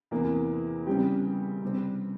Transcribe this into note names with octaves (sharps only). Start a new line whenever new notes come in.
E2 C3 E3 A#3
C#3 G3 C4 G4
C3 G3 C4